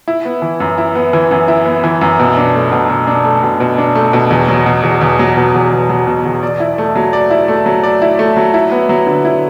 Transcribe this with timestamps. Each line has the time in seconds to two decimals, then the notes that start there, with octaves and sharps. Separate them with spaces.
0.08 E4
0.25 B3
0.42 E3
0.60 F#2
0.78 E4
0.95 B3
1.13 E3
1.31 F#2
1.48 E4
1.66 B3
1.84 E3
2.01 F#2
2.20 B2
2.37 D4
2.54 A3
2.72 B2
2.90 B2
3.07 D4
3.24 A3
3.43 B2
3.60 B2
3.78 D4
3.95 A3
4.13 B2
4.30 E2
4.48 F#3
4.66 B2
4.83 E2
5.01 E2
5.19 F#3
5.37 B2
5.54 E2
5.72 E2
5.89 F#3
6.07 B2
6.25 E2
6.43 D5
6.60 E4
6.78 A3
6.96 F#3
7.13 D5
7.30 E4
7.48 A3
7.66 F#3
7.84 D5
8.02 E4
8.19 A3
8.37 F#3
8.54 E4
8.72 B3
8.89 F#3
9.07 D3
9.25 E4